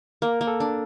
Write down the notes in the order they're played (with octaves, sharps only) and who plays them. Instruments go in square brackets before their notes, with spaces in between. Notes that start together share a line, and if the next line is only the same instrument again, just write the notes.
[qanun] A#3 [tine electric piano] A#4
[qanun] A#3
[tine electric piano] A4
[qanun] D4